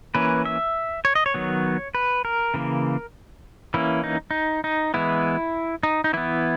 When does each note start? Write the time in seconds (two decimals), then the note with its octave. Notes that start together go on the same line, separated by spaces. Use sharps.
0.15 E3 A#3 C#4 B4
0.45 E5
1.05 C#5
1.15 D#5
1.26 C#5
1.34 D#3 F#3 B3
1.95 B4
2.25 A#4
2.54 C#3 E3 A#3
3.74 E3 A#3 C#4 E4
4.04 D#4
4.31 D#4
4.64 D#4
4.94 E3 G#3 B3 E4
5.83 D#4
6.04 D#4
6.13 E3 B3 E4